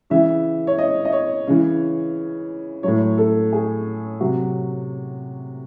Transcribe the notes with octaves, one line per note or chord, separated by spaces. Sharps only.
C#3 E3 E5
C#5
D#5
D#5
C#5
C#3 E3
A2 F#3 C#5
A4
G#4
C3 F#3 F#4